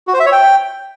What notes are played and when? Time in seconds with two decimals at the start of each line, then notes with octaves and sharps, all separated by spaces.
0.07 F#4
0.14 C5
0.20 E5
0.26 C#5
0.32 G5